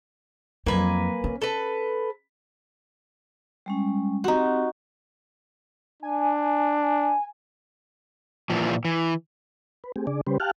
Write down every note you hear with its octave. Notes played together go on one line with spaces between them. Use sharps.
F2 F#3 A#3 B4 G#5
C#4
A4 B4
G3 G#3 C#4
C4 D#4 F#4 G4
D4 G#5
A#2 E3 F3
E3
B4
A3 C4 G4 G#4
C#3 D4 G#4 D5
C#3 G3 C#4 G4 B4 C5
G4 F5 G5 A5 F6 F#6